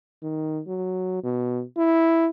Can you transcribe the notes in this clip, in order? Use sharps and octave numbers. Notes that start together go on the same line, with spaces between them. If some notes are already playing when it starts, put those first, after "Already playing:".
D#3
F#3
B2
E4